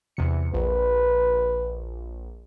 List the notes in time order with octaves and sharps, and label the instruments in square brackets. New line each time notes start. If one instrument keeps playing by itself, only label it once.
[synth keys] E2 C3 C#7
[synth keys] A#1 [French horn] B4